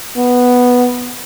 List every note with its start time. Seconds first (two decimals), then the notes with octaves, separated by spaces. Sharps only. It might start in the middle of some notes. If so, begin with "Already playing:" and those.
0.18 B3